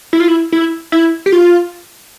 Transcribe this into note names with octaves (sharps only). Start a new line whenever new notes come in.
E4
F4
E4
E4
E4
G4
F4